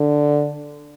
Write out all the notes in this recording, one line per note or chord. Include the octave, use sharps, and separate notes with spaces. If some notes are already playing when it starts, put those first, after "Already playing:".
Already playing: D3